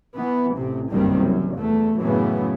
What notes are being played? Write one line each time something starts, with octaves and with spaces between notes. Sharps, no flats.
E3 B3
A1 C3
F#1 C2 G2 C3 D#3 G3
F#2
E2 A3
F#2 A2 C#3 E3 B3